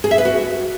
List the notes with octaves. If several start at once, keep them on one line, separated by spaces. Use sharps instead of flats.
G#4
E5
B4
F#4